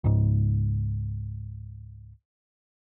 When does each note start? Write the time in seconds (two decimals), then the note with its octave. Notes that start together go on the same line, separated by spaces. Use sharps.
0.04 C#2 G#2